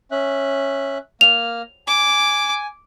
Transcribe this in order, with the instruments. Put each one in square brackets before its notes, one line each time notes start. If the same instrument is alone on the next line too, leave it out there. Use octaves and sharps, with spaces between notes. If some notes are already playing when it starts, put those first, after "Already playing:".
[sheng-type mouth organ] C#4 E5 F#6
[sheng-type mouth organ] A#3 F6 [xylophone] F7
[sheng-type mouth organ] G#5 [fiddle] D6